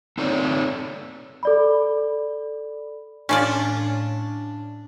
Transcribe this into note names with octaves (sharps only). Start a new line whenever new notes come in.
C4 D#4 A4 C#5 D5
A4 D5 B5
A2 C#4 D4 F4 D5